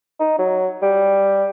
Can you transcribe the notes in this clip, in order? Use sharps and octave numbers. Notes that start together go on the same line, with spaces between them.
D#4
F#3
G3